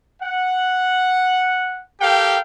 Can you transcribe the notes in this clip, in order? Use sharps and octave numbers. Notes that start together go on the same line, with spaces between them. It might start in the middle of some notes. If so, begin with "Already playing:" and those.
F#5
G4 A4 A#4 F5 G5